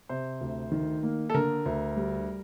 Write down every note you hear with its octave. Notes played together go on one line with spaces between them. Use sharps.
C3 C5
D2
D#3
A#3
A4
D3 A#4
D2
G3